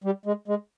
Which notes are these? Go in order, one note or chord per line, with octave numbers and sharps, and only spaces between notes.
G3
G#3
G#3